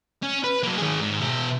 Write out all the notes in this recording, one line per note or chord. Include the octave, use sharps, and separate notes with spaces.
C#4
B4
F#3 A#3
D#3 G#4
G#2
B2 E5